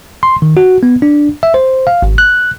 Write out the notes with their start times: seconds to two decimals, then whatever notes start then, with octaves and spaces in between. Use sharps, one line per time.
0.23 C6
0.42 D#3
0.57 F#4
0.83 B3
1.02 D4
1.43 E5
1.54 C5
1.87 F5
2.02 G#1
2.18 F#6